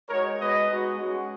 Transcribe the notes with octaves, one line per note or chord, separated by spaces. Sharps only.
G#3 D#4 F#4 A#4 C#5
G#3 B3 F#4 B4 D#5
G#3 B3 D#4 F#4
G#3 C#4 F#4